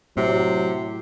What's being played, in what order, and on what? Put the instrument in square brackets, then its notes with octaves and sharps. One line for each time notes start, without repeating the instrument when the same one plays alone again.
[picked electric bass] A2 [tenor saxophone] C3 [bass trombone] F#3